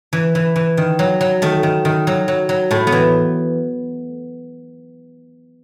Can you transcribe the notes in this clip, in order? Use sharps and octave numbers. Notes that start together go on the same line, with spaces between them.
E3
E3
E3
D#3
F#3
F#3
D#3 A3
D#3
D#3
F#3
F#3
F#3
A2 A3
B3
E3